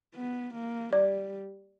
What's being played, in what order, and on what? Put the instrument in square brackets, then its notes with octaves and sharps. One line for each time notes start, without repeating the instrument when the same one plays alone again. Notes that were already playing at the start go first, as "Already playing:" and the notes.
[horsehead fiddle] B3
A#3
[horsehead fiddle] G3 [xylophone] D5